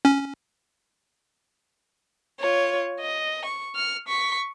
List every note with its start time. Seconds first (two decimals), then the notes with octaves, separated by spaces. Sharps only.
0.05 C#4
2.40 F4 C#5
3.00 D#5
3.45 C#6
3.75 F6 C#7
4.08 C#6 B6